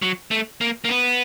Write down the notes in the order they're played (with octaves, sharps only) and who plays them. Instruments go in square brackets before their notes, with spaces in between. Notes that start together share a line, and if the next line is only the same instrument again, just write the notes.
[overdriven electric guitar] F#3
A3
A#3
A#3
B3